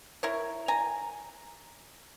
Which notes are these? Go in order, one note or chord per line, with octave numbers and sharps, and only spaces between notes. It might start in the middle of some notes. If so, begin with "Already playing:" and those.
E4 A#4 C#5
G#5 A#5